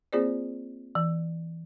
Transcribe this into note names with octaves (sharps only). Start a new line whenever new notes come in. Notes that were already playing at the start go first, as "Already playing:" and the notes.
A#3 C4 F4 G#4 C5 D5
E3